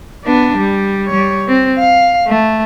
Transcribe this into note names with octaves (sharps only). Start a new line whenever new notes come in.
B3 D4
G3
G3 C#5
C4
F5
A3